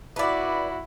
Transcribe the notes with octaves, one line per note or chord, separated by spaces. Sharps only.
E4 F#4 B4 D5